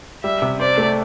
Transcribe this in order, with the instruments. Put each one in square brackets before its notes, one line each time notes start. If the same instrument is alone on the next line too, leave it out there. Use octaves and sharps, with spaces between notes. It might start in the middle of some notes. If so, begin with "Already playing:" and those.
[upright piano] G3 [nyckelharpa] E5
[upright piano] C3
[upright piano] C5 [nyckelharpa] D5
[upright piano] A3